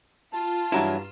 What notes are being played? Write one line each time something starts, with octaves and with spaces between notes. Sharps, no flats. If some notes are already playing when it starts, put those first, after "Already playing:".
F4 A5
G2 E3 F#3 E4 A#5 E7